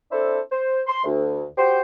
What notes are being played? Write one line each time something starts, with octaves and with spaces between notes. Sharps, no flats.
C4 D4 E4 A4 C5
C5
C6
D2
F#4 G4 C5